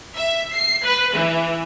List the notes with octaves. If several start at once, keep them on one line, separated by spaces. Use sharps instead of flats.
E5
C7
B4
E3